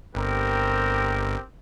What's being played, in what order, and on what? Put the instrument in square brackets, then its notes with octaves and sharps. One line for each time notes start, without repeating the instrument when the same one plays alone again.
[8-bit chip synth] G1 [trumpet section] C4 G4 A#4